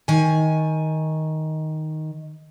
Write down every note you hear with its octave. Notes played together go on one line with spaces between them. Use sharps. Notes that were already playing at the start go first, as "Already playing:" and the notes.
D#3 G#5